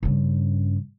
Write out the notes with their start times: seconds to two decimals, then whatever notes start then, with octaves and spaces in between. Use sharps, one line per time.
0.03 G2 C#3